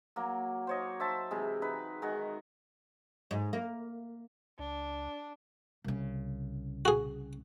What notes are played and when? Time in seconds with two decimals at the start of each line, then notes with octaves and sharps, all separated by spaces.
0.16 F#3 A#3
0.67 C5 C#5 D#5
1.00 C5 E5 A5
1.31 C3 E3 G#3
1.62 D#4 B4
2.02 D#3 G#3 F#4
3.31 G#2
3.53 A#3
4.59 C#2 D4
5.84 C2 C#3
6.85 F#4 G#4